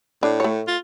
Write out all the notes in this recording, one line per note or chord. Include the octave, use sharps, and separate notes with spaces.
A2 D4
A3 C#5
F4